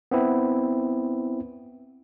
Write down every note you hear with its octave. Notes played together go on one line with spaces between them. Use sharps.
B3 C4 E4